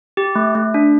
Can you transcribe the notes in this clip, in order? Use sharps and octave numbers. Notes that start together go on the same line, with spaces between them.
G4
A3
A3
D4